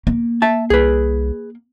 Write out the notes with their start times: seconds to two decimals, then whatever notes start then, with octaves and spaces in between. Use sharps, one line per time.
0.07 A#3
0.42 E5 A5
0.70 C2 G#4 B4